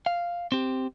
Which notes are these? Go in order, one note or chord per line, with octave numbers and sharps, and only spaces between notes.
F5
C4 G4